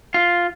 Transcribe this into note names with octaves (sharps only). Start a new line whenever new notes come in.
F4